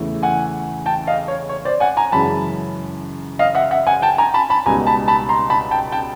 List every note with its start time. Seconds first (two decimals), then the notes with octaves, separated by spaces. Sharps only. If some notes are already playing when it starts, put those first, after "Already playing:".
Already playing: E2 C#3 E3 A3
0.23 F#5 G#5
0.86 G5 A5
1.07 D#5 F5
1.28 C#5
1.49 C#5
1.65 C5 D5
1.80 F#5 G#5
1.97 G#5 A#5
2.12 F#2 C#3 E3 G#3 A5 B5
3.39 D#5 F5
3.55 E5 F#5
3.71 E5 F#5
3.87 F#5 G#5
4.02 G5 A5
4.18 G#5 A#5
4.34 A5 B5
4.50 A5 B5
4.66 C#2 B2 G3 B3 D#4 G#5 A#5
4.87 A5 B5
5.08 A5 B5
5.29 A#5 C6
5.50 A5 B5
5.71 G5 A5
5.92 G5 A5